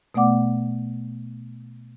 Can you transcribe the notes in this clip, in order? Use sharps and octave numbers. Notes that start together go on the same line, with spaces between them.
B2 A3 B3 D5 F#5 D6